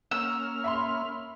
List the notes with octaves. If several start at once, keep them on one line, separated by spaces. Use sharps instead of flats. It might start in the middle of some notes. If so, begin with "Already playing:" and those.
A#3 C#4 E6 F6
E5 B5 C6